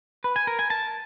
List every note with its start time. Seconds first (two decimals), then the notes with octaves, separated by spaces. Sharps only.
0.24 B4
0.36 G#5
0.47 A#4
0.59 G#5
0.70 A5